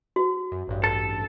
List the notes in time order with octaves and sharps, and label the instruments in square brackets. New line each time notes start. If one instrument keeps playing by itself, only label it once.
[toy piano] F#4
[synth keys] F#2
A1 G2
[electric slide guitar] A4